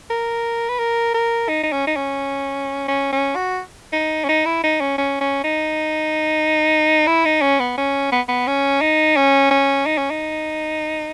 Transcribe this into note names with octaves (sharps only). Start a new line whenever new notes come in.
A#4
B4
A#4
A#4
D#4
D#4
C#4
D#4
C#4
C#4
C#4
F#4
D#4
C#4
D#4
E4
D#4
C#4
C#4
C#4
D#4
E4
D#4
C#4
B3
C#4
B3
B3
C#4
D#4
C#4
C#4
D#4
C#4
D#4